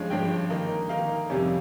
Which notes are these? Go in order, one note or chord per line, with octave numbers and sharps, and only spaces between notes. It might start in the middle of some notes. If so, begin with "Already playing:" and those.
Already playing: G2 F3 G#3 C#4 F5
G2 F3 G#3 C#4 G5
D#3 A#3 D#4
D#3 A#3 D#4 F5
F2 C3 G3 C#4